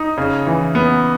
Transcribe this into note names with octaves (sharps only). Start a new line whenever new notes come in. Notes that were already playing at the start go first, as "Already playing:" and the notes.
Already playing: D#4
C#3
E3
B3